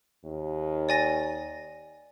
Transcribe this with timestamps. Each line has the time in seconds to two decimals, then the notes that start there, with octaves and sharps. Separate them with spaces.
0.25 D#2
0.89 D5 G#5 A#6